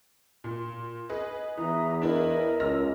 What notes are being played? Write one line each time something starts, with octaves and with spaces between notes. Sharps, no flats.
A#2
G#4 B4 D#5
E2 E3 E5 A#5 D#6
D4 E4 A#4 B4 D#5
C#2 E6 F6 A#6